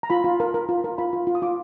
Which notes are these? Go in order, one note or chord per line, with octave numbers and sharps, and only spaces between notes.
A#5
F4 B5
F4
A#4
A#4
F4
A#4
F4 B5
F4
F4
D#6
F4 D6